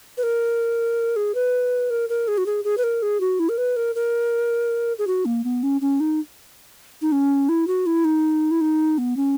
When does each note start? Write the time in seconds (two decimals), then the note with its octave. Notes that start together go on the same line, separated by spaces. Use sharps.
0.17 B4
0.23 A#4
1.16 G#4
1.35 B4
1.90 A#4
2.09 A#4
2.28 G#4
2.38 F#4
2.46 G#4
2.64 G#4
2.78 B4
2.84 A#4
3.02 G#4
3.20 F#4
3.39 E4
3.49 A#4
3.58 B4
3.76 A#4
3.95 A#4
4.99 G#4
5.07 F#4
5.25 A#3
5.44 B3
5.63 C#4
5.81 C#4
6.00 D#4
7.02 D#4
7.12 C#4
7.49 E4
7.67 F#4
7.86 E4
8.04 D#4
8.51 E4
8.61 D#4
8.98 B3
9.17 C#4